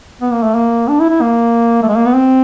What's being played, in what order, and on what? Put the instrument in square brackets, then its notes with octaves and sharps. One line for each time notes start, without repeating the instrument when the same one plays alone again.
[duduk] B3
A#3
A3
A#3
D4
E4
E4
A#3
A3
G#3
A#3
B3
C4